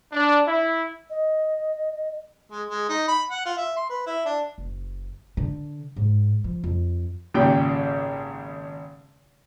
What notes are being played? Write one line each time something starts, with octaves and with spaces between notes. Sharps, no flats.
D4
E4
D#5
G#3
G#3
D#4
B5
F#5
F4
E5
C6
B4
E4
D4
F#1
D3
G#2
F3
F2
G#1 A#2 C#3 G4 G5